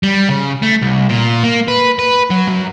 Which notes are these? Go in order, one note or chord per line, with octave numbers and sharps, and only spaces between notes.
G3
C#3
A3
C2
A#2
A#3
B4
B4
F#3
F#2